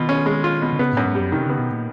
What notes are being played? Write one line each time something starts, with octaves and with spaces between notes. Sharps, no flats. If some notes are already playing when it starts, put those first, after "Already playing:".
Already playing: B2 D#3 F4
C#4
G#3
F4
B2
D3
C#3 B3
F#2 A2
G#2
F#2 G3
C3 D#3
C#3 B3
B2
A#2